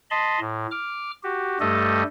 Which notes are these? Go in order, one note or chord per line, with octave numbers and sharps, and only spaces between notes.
D#5 A5 B5 C6
A2
D6 F6
F#4 G4
G2 G3 A3 G4 A4 D#5